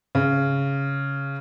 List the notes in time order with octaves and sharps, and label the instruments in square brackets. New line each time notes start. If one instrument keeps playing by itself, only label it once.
[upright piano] C#3